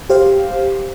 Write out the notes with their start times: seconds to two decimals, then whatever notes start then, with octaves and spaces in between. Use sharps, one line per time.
0.10 G4 C5 F5